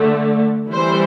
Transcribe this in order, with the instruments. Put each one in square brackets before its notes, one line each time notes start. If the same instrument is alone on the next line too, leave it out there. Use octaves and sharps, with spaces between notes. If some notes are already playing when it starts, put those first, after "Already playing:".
Already playing: [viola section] D3 A3
E3 G3 C4 C5